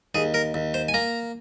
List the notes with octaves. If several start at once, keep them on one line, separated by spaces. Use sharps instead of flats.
D#2 G#4
A#4
D#2
C5
G#5
A#3 A#5